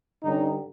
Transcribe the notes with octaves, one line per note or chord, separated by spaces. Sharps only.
G2 D3 G3 C#4 D#4